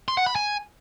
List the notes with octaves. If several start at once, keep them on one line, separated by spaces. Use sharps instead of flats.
C6
F#5
B5
G#5